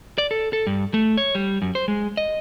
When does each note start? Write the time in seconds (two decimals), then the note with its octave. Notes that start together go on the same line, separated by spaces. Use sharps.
0.18 D5
0.31 A4
0.53 A4
0.67 G2
0.94 A3
1.17 C#5
1.35 G3
1.62 F#2
1.75 C5
1.88 G#3
2.17 D#5